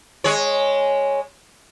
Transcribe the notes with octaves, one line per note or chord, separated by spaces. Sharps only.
G#3 C#5